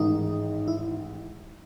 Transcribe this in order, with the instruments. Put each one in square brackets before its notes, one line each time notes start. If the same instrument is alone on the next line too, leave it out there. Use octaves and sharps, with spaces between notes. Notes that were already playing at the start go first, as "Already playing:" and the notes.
Already playing: [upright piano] A1 G#2 D#3 G#3 [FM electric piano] D#4
[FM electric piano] E4